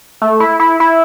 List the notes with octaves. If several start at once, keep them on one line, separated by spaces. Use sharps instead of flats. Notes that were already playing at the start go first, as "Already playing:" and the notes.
A3
E4
E4
E4